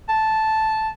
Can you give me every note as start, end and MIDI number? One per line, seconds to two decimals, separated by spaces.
0.09 0.88 81